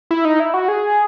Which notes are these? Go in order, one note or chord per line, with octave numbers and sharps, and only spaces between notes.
E4
D#4
E4
F#4
G#4